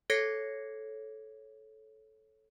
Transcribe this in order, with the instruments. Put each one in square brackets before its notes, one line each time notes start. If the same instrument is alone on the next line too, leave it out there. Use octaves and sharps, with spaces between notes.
[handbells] A4 C#5 G#6 A#6 C7 C#7